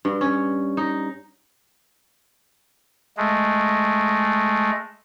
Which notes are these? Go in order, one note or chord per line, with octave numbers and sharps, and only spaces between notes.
G2
C#4
D#4
G#3 A3